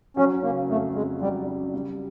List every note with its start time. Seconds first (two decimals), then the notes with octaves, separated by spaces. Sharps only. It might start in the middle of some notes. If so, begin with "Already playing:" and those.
0.17 F#3 C#4
0.43 C#3 A#3
0.69 F2 A3
0.95 F2 G#3
1.21 F#3 G3
1.47 C#3
1.74 G3